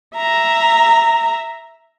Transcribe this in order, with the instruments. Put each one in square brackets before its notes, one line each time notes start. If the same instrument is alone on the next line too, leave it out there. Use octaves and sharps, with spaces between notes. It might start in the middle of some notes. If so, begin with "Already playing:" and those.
[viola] E5 A#5